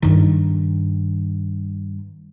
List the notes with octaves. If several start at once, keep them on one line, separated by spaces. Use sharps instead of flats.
G2 D#3